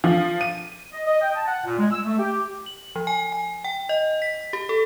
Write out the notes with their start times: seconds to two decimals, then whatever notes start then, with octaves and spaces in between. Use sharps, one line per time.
0.04 F3
0.41 D#7
0.92 D#5
1.07 D#5
1.21 G5
1.35 A5
1.47 F#5
1.64 A#2
1.78 G#3
1.91 E6
2.04 A3
2.18 G4
2.66 F#7
2.96 F3
3.07 G#5
3.32 G#5
3.64 G5
3.89 D#5
4.22 B6
4.53 G4
4.69 A4